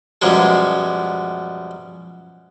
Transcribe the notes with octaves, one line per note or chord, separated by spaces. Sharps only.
F#2 B2 F3 G3 G#3